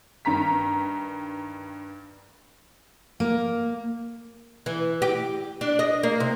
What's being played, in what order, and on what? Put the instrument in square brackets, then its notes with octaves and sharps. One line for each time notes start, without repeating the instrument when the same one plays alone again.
[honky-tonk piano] G2 D#3 A#5 B6
[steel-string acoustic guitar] A#3
[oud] E3
G4
D4
D#5
A#3
C3